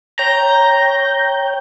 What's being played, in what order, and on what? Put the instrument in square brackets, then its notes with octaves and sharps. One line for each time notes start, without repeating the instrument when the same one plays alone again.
[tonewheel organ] C#5 G5 G6 [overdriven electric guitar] A#5